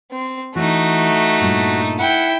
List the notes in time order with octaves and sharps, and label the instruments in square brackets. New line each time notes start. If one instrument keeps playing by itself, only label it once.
[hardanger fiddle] C4
[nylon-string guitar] E3 [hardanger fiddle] A3 D#4 [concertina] F#4
[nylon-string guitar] G2 A#2
[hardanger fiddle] E4 G5 [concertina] F#5